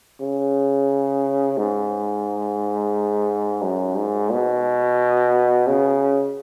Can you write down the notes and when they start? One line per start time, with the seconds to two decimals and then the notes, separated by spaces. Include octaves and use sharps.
0.20 C#3
1.57 G#2
3.62 F#2
3.96 G#2
4.30 B2
5.67 C#3